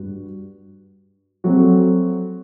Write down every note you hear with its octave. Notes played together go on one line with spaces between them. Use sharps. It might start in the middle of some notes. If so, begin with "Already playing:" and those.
Already playing: G2 F#4
F#3 A3 C4 F#4